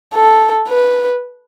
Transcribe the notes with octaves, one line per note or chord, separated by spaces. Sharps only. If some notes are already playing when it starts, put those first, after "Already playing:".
A4
B4